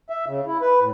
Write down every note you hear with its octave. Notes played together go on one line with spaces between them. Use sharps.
E5
C#3
E4
B4
A2